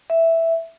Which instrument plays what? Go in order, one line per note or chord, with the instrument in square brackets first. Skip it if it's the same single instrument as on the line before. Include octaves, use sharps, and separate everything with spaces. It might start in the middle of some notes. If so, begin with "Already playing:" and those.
[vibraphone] E5